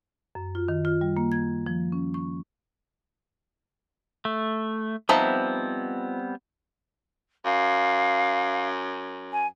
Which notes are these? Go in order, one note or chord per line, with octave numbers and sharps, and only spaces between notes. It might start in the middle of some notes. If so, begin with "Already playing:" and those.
F#2
F4
D#3
F4
G3
A#3
G#6
F3
C#4
C#6
A3
F3 G3 B3 C4 D#4 E5
F#2 F5
G#5